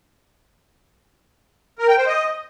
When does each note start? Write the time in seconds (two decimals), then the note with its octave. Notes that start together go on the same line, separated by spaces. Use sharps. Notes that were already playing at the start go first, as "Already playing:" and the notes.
1.79 A#4
1.88 G5
1.97 C5
2.07 D#5